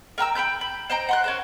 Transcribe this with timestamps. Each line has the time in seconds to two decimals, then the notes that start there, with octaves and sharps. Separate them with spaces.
0.18 A#4 G5 A#5 E6
0.35 G5 A#5 B5 G6
0.61 B5
0.90 C5 D#5 G5 A#5
1.09 F#5 C6 F#6
1.24 C#4 A#4 C5